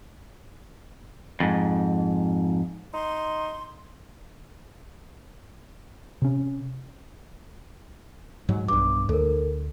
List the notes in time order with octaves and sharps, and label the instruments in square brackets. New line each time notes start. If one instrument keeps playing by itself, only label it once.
[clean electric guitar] F2 G#2
[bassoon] D#4 [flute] C6
[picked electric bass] C3 C#4
[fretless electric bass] G#2 F#3
[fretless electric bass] B1 G2 [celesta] D6
[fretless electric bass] D2 [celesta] A4 A#4